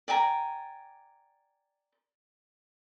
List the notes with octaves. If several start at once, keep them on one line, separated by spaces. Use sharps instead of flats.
D5 G5 G#5 A#5